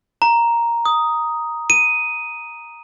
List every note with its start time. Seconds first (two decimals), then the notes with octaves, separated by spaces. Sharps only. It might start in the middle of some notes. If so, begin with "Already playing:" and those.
0.22 A#5
0.86 D#6
1.70 D#7